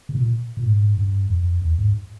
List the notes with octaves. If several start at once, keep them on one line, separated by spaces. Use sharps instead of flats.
C3
A#2
A#2
G#2
G2
F2
E2
G#2